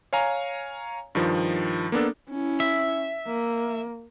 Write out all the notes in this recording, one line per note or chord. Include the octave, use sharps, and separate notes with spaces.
C#5 F5 G#5 A#5
G2 D#3 F3
A#3 B3 D4 A4
C#4 E4
E5
A#3